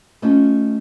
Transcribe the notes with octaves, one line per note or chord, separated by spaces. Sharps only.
A3 C#4 D#4 F4 A4